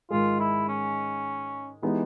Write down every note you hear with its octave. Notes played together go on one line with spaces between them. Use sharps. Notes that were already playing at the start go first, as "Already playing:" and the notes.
G#2 D#3 G#3 F4
E4
C#4
E3 G#3 B3 D#4 G4